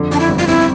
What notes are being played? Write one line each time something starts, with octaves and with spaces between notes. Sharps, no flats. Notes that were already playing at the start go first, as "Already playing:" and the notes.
Already playing: F2 D3
F2 D4
E4
G1
F4
C4 E4